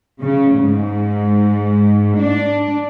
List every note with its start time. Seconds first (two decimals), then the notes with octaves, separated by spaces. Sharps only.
0.22 C#3
0.59 G#2
2.19 D4